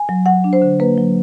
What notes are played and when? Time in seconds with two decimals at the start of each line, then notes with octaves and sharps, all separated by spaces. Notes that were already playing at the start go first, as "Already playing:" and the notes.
Already playing: G#5
0.09 F#3
0.26 F#3 F#5
0.44 D4
0.53 C5
0.62 D3
0.80 A#3 B4
0.98 F#3